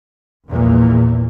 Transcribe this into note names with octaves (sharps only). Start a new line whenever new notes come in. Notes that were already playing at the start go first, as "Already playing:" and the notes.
A#1 E2 A#2